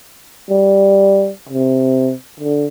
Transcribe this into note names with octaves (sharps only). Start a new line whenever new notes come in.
G3
C3
D3